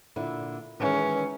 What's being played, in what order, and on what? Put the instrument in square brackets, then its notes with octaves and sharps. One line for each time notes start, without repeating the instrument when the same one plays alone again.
[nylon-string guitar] A#2 D3 E4
[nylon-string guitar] D#3 E3 G#3 [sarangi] C#4